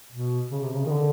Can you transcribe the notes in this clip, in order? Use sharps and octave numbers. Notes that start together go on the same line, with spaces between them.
B2
C#3
C3
C#3
D#3
D3